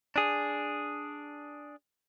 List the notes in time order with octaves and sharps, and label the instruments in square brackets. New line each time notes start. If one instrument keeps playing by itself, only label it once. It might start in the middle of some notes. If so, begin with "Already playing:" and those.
[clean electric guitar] D4 G#4